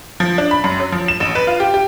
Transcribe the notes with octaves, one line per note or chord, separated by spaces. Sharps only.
F3
D4
B5
F#2
F#3
F3
E7
A1
B4
F4
G4
G4